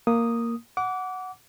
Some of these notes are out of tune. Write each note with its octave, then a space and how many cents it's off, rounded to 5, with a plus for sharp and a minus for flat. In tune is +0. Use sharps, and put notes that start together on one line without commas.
A#3 -5 D#6 -5
F#5 +0 D6 -25